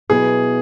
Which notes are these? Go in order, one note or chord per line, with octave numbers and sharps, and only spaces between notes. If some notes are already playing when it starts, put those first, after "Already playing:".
B2 F#3 B3 E4 G#4